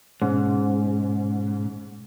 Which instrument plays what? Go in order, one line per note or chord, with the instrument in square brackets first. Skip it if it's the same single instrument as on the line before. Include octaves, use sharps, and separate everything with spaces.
[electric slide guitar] G#2 [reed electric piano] B2 C#4